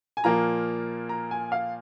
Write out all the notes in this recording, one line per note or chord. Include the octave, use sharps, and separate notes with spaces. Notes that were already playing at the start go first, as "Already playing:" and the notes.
G#5
A#2 F3 A#3 A#5
A#5
G#5
F5